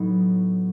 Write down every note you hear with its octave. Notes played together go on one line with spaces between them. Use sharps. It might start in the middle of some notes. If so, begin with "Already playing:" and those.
Already playing: A2 F#3 B3 D#4